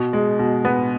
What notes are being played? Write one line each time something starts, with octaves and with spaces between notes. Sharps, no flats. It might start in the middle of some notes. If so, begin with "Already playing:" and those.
Already playing: B2
G#3
B2
B3